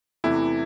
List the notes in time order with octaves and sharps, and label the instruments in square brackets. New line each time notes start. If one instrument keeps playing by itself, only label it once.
[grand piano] E2 C3 E3 A3 [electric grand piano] E4